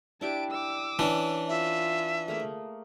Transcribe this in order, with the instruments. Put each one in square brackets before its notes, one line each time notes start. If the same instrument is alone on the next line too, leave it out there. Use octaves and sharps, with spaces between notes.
[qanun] D4 E4 G4 [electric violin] A5 D7
[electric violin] D6 E6
[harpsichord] E3 D4 [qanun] C#4
[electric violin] F4 [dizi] E5
[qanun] A3 A#3 G#4